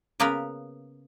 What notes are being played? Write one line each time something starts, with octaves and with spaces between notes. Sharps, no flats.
C#3 A#3 B3 A#4 B4